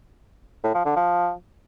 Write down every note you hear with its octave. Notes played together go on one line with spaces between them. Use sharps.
A2
F3
D3
F3